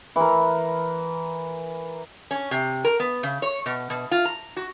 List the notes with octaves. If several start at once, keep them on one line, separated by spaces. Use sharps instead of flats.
E3 A#4
C#4
C3
A#4
B3
C#3
C#5
B2
B2
F4
A#5
F#4